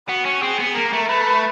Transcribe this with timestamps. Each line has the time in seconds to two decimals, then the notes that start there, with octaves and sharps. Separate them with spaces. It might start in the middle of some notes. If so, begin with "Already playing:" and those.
0.08 B3 F#4
0.25 C#4
0.42 C4 G#4
0.59 B3
0.75 A#3 A#4
0.93 A3
1.09 A3 B4